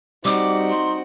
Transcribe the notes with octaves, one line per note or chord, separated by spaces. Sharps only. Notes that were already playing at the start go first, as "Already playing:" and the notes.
G3 C4 D#4 F#4 D6
C6